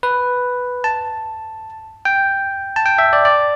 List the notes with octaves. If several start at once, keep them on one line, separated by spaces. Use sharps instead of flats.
B4
A5
G5
A5
G5
E5
D5
D5